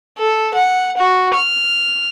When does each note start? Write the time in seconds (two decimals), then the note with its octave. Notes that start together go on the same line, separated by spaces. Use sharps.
0.18 A4
0.54 F#5
0.97 F#4
1.34 F6